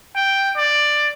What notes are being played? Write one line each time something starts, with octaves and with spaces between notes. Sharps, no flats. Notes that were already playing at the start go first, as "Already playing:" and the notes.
G5
D5